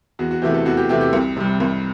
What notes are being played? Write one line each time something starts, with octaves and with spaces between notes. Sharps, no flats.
E2 F#4
F#4
C3 E3 A3 G4
A4
E2 F#4
G4
C3 E3 A3 G4
G4
C2
C3 G3
C2